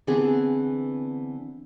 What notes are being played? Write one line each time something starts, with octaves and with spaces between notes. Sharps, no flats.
D3 E3 B3 C4 G#4